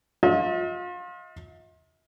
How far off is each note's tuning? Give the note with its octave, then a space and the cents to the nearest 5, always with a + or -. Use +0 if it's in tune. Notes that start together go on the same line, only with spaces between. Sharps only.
F4 +35 E5 -45